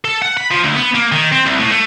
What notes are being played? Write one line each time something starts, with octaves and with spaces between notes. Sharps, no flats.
A4
F#5
B5
F3
D2
B3
A#3
D#3
C4
C2
A2
A3